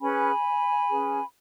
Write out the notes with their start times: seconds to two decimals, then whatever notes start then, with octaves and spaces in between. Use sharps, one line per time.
0.01 C#4 G#4 B4 G#5 B5
0.88 C#4 G#4 B4